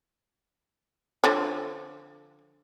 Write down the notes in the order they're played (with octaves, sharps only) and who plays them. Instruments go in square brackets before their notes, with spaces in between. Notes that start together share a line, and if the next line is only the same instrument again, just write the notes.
[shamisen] D3 F3 C#5